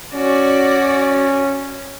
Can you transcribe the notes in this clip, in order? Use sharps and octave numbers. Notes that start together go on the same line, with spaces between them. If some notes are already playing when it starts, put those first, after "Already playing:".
C#4 F#4 D5